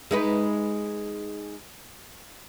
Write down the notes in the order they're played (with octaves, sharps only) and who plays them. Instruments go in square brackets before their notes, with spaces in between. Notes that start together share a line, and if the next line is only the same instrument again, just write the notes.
[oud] G#3 D#4 B4